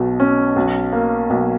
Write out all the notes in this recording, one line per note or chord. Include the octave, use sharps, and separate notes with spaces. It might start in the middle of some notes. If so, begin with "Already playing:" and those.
Already playing: B1 B2
C#4
B1
A#3
B1